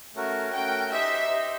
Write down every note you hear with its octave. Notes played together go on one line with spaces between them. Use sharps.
A3 C#4 F#4 A#4
A3 C#4 F#4 A#4 G5
D#4 G4 C5 D#5 E5
D#4 G4 C5 D#5